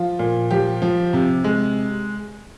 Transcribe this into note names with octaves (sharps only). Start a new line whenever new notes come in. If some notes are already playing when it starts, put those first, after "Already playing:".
Already playing: F3 F4
A#2
F3 G4
F3
C3
G#3